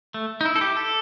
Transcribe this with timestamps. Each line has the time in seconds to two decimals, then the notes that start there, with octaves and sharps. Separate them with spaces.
0.14 A3
0.41 D#4
0.45 E4
0.56 A4
0.61 G4
0.76 A4